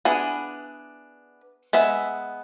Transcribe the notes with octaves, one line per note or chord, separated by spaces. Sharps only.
B3 D4 E4 G#4
G#3 B3 E5